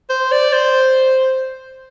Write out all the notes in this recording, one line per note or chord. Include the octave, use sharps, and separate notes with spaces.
C5
D5
C5